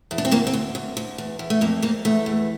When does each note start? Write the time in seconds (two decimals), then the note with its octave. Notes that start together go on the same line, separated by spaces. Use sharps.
0.11 E2
0.18 D4
0.25 C4
0.31 D2 A#3
0.47 C4
0.53 D2
0.75 D2
0.97 D2
1.18 E2
1.39 E2
1.50 A3
1.61 F2 A#3
1.82 F2 A#3
2.05 E2 A3
2.26 E2